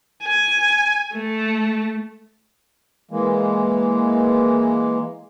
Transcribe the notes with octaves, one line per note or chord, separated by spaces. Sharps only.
G#5
A3
E3 G#3 A#3